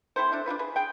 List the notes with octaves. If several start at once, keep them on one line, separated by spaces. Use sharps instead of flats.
C4 E4 A4 C5
D4 A4 E5
D4 D#4 F4 B4
G#4 B4
G#4 G5